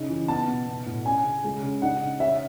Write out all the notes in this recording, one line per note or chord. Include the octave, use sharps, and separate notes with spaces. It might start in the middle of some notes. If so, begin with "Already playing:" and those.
Already playing: C#3 D#4
E3
B3 A5
B2
B3
A2
C#4 G#5
C#3
G#3
C#3
D#4 F#5
C#3
C#4 E5